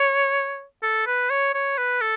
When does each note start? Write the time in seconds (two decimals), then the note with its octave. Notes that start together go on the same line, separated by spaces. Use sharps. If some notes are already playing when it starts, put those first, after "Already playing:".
Already playing: C#5
0.83 A4
1.07 B4
1.30 C#5
1.54 C#5
1.78 B4
2.01 A4